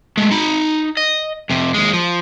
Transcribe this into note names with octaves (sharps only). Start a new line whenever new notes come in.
G#3 A3
D#4 B5
D#5
F2 C3
D#2 G#3
F3